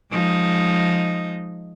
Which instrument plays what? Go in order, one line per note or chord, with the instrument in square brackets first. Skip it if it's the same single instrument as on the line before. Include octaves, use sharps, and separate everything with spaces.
[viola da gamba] F3 G#3 D#4